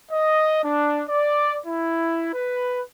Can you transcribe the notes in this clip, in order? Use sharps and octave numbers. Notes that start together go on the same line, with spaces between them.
D#5
D4
D5
E4
B4